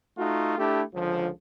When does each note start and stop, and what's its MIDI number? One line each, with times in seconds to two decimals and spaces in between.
0.18 0.57 57
0.18 0.57 63
0.18 0.57 65
0.18 0.57 66
0.58 0.82 57
0.58 0.82 62
0.58 0.82 64
0.58 0.82 67
0.58 0.82 69
0.94 1.29 37
0.94 1.29 50
0.94 1.29 53